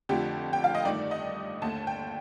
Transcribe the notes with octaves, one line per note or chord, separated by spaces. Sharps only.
F2 D3 F3 A3 G4
G5
F5
D#5
G2 D#3 A3 D5
D#5
D#2 D3 A3 A5
G5